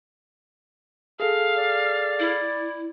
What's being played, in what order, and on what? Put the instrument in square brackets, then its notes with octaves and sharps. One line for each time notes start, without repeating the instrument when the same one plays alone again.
[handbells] G#4 A4 [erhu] F5
[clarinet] D5
[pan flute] E4